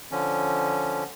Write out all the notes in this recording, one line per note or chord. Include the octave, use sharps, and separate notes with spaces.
D3 F3 C#4